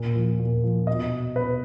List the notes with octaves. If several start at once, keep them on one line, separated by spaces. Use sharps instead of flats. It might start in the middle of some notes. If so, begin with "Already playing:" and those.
Already playing: A#2
F3
A#2
F3
B2 D#5
B2 B4